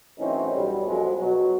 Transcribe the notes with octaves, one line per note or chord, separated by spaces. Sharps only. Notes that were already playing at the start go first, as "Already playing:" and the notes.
F#2 A2 E3 C4 C#4 D#4
B1 G3
A#1 F2 F#3 G#3
B2 F#3